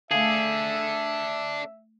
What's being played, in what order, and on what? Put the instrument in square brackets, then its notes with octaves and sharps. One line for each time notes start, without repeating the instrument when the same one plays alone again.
[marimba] A3 F5 [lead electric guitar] D4 A4 [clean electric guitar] G#4 [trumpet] E5